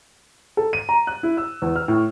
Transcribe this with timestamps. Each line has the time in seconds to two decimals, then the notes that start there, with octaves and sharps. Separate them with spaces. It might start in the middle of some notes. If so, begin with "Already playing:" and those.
0.57 A4
0.73 D#7
0.89 A#5
1.07 F#6
1.23 E4
1.37 E6
1.62 E2
1.76 F6
1.88 A2